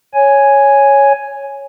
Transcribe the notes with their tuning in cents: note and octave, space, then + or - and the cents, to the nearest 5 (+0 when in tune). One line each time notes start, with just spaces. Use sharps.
C#5 +0 G#5 +0